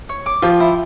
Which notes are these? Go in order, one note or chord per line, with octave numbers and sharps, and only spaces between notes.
C#5
D6
F3 F4 G5
E4